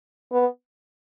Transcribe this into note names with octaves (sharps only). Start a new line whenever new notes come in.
B3